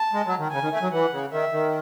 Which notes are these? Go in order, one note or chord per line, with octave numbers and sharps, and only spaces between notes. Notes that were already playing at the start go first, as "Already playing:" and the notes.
Already playing: A5
G#3
F#3
D#3
C#3 G#5
D#3
A3
F#3
E3 F#5
C#3
D#3 E5
D#3